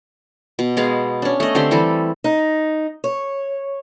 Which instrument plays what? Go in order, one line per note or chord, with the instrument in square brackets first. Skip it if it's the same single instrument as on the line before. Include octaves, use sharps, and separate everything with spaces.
[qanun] B2
G#3 B3 G#4 F5
C#4 D4
A3 D#5
D3 C4 G4 C6
E3 G3 A4
[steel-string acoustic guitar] D#4
C#5